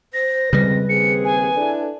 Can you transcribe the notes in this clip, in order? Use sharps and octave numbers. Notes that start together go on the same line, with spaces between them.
C5 A#6
F2 C#3 G3 G#3 C4 B4
D#2 C4 G#4 C#7
G#5
D4 E4 A4